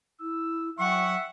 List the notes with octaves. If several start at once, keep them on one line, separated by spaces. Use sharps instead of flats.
E4 E6
F#3 E5 F#5 G5 C#6